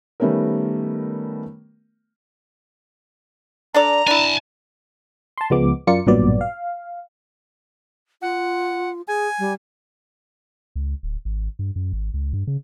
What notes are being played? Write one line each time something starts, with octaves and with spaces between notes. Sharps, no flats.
D#3 G3 A3 B3 C#4 A#4
D4 A4 D5 A#5
D4 E4 G#5 A5
A5 C6
C#2 F3 G#3 B3 D6
F#2 F4 A#4 D5 C#7
A1 G2 A#2 F#3 B3 D5
F5
F4 F#5
G#4 G#5
G3
C#2
D1
G#1
G2
F#2
G#1
C#2
G2
C#3